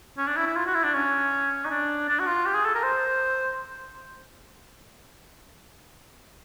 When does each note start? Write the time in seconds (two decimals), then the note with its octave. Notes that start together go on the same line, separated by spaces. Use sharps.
0.18 C#4
0.27 D4
0.36 E4
0.47 E4
0.56 F4
0.66 F#4
0.74 E4
0.84 D4
0.94 C#4
1.65 D#4
1.70 D4
2.08 D4
2.19 F#4
2.26 F4
2.46 G4
2.55 G#4
2.65 A4
2.75 A#4
2.83 C5